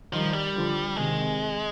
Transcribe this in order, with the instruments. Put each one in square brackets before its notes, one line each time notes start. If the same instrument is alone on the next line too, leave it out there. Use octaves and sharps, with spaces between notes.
[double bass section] D#3 G3 [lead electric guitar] F3
[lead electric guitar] G3
[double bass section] D3 F3
[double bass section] C3 D#3 [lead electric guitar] G#3